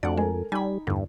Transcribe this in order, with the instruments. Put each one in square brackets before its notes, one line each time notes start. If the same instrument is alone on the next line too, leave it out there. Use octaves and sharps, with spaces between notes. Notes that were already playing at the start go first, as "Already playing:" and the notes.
[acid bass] F2 [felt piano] A3 D4 F#4 [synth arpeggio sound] D5 F#5
[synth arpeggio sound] G#3 [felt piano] A4 A#4 G#5
[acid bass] G3 [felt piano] D#4 [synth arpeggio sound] G#5 B5
[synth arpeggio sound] E2 D3 [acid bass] G2